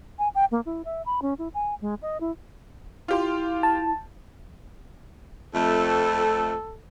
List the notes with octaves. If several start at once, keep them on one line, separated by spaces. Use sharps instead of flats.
G#5
G5
A#3
E4
E5
B5
C#4
E4
G#5
G#3
D#5
E4
E4 F4 G4 C6
A5
F2 A3 A4